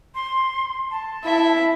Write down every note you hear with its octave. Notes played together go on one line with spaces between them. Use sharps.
C6
A5
E4 E5